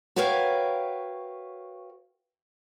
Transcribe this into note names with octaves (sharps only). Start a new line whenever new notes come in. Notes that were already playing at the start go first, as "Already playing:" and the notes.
F#4 A#4 B4 C#5 F5 G5